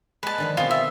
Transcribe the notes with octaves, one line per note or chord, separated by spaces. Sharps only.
G#3 B4 A5
D3 D#3 F3
B2 C4 F4 G#4
E5